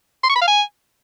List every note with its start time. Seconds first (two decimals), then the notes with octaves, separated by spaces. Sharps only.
0.23 C6
0.29 C#6
0.36 B5
0.42 F5
0.48 G#5